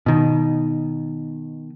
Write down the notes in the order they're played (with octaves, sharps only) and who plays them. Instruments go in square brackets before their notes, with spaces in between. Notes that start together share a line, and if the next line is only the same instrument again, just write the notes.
[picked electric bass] B2 D#3